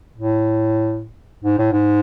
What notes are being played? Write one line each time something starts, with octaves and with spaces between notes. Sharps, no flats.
A2
G#2
A2
G#2